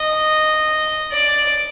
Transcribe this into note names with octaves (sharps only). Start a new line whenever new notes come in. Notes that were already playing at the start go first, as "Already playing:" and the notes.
Already playing: D#5
D5